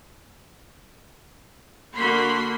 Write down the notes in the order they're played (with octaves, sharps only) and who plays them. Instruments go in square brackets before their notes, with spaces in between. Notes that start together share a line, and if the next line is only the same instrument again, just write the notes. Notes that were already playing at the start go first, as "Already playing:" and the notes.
[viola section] D3 A#3 F#4 B5 C6